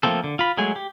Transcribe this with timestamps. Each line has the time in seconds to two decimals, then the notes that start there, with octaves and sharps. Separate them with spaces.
0.03 F3 A3 A#3 C4 A4
0.24 D3
0.39 F4 B5
0.57 F#3 G#3 A3 G#4
0.76 G4